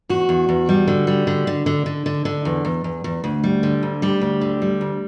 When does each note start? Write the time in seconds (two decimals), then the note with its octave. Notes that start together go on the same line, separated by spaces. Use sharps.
0.09 E2 F#4
0.29 E2
0.49 E2
0.69 G3
0.88 D3
1.07 G3
1.27 D3
1.47 D3
1.66 D3
1.86 D3
2.06 D3
2.25 D3
2.45 E2
2.65 E2
2.84 E2
3.04 E2
3.24 D2
3.44 G3
3.63 D3
3.83 D2
4.02 G3 G4
4.21 D2
4.41 D3
4.62 G3
4.81 D2